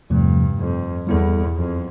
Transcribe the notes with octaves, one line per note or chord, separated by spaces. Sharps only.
E2 G2 C3 F3 A3
F2
E2 G3 B3 E4 A4
F2